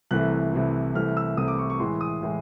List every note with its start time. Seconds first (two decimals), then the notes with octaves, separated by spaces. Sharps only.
0.11 C2 C3 E3 A3 F#6
0.53 C2 C3 E3 A3
0.95 C2 C3 E3 A3 F6
1.17 E6
1.37 C2 C3 E3 A3 D#6
1.48 D6
1.59 C#6
1.70 C#6
1.80 A2 E3 G#3 C6
2.01 D#6
2.22 A2 E3 G#3